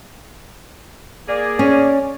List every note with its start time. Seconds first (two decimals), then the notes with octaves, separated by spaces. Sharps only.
1.28 A#3 G#4 D5
1.59 C#4